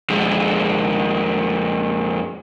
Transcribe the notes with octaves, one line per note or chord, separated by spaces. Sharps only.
F2 G#3